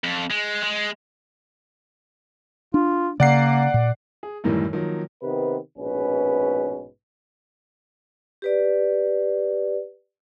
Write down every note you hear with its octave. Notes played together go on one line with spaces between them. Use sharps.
F2
G#3
G#3
D4 F4
C#3 A#3 D5 F#5 C7
A#2
G#4
F#2 A2 D#3 E3 G3
D#3 F3 F#3 A#3
C3 D#3 B3 B4
A#1 G#2 B2 C#4 B4
G4 B4 D5